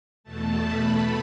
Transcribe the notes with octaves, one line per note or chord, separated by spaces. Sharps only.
E2 B2 A3 A5
B5